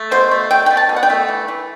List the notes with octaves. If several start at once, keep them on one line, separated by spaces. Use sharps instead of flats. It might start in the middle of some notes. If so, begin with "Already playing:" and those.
Already playing: A3
B2 C5
A3
B2 G5
G5
A3
A5
B2
F#5
G5
A3
E3
E3